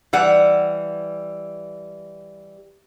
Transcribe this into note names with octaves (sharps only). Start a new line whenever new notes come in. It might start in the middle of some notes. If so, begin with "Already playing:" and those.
E3 G3 F#5